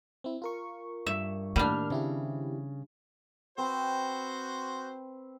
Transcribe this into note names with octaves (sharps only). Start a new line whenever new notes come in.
C4 E4
F4 A#4 C#6
G2 E5
A2 D#3 G3 A#3 D4 F6
C#3 C4 E4 G4
C4 F#4 B4 C5